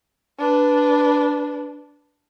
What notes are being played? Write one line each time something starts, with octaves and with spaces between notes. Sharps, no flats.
D4 B4